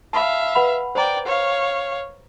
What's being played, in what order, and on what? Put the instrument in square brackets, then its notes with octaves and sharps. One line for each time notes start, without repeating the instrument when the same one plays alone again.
[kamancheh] E5 F5 [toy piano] A5 B5
[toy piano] B4 F#5 B5
[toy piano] C5 A#5 [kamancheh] D5 G5
[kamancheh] C#5 F5